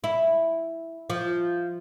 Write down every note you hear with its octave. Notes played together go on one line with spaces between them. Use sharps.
E4
F3